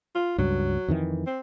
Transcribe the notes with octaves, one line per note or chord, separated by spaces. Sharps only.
F4
C#2 G2 F#3
F2 D#3 E3
C4